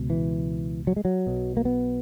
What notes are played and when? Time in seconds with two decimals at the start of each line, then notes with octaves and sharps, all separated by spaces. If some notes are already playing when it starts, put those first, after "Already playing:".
Already playing: C#2 B2
0.10 E3
0.87 F#3
0.96 G#3
1.05 F#3
1.27 B1 B2
1.57 A#3
1.65 B3